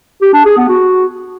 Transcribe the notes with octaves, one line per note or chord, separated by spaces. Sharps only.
G4
D4
G#4
B3
F#4